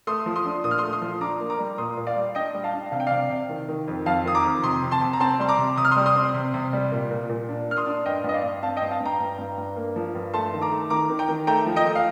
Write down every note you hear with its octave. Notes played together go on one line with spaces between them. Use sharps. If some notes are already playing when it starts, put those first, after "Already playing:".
A3 C6 D#6
F3
C6 D#6
D4
A#2 D#6
F6
C6 D#6
A3
C6 D#6
F3
D4 A#5 D6
A#3
A#5 D6
G3
A#2 C6 D#6
A#2
D5 F5
G3
D4 D#5 G5
G3
F5 A5
D4
C3 F5
G5
C3 D5 F5
C3
D#3
D#3
F2
F2 F5 A5
D#3 D#6
A#5 D6
F2
C3 C6 D#6
C3
A5 C6
C3
A#5
C4 A5 C6
G3 C6
A#5 D6
C3
C3 D#6
F6
C6 D#6
G3
C6 D#6
C4
C3
C3
G3
A#2
A#2
A#2
D4
A#3 F6
C6 D#6
D4
G2 D#5 G5
G2 D#5
D5 F5
G2
C4 F5 A5
D#5 G5
G2
F5 A5
G2
G5 A#5
G2
G2
G2
A#3
F3
G2
A3 A5 C6
D#3
A#5 D6
A3
D#3 A#5 D6
D#3
G5 A#5
D#3
A3 G5 A#5
F3
D#5 G5
A3
F5